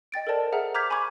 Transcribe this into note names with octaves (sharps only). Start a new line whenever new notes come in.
D#5 G5 A6 D7
A4 A#4 C5 D5 A5
G#4 C5 E5 F#5 A#5 F6
A#5 D6 F6 G6 G#6 B6
G#5 B5 C#6 D6 G#6